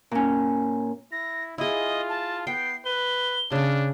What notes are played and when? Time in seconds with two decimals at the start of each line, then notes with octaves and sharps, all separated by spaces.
0.11 A#2 C#4
1.12 E4 A#6
1.58 E4 F4 G#4 D#5
2.09 A5
2.47 B3 G5 C7
2.85 B4 G7
3.52 C#3 C#4 D4